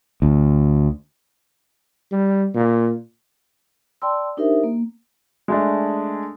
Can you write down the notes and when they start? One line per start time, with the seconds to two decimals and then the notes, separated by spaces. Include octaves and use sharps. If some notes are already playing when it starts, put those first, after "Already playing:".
0.22 D2
2.12 G3
2.55 A#2
4.02 D5 G5 A5 C6 E6
4.37 D4 D#4 G4 A#4 C5 E5
4.64 A#3
5.48 G#3 A3 D4